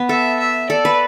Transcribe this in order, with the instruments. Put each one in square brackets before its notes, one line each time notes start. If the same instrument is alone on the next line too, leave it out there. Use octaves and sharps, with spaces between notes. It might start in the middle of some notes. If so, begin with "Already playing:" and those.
Already playing: [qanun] B3
[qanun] A4 [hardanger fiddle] E5
[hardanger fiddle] E5
[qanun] A4 [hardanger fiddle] D5
[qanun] B4